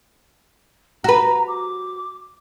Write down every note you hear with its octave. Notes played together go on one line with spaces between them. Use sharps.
F#4 B4 A#5
D6